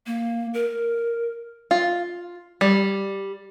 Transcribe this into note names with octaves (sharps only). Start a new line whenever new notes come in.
A#3
A#4
F4
G3